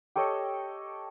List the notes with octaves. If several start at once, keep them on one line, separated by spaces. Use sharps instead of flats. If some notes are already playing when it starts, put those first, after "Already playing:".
G4 A4 C#5 D#5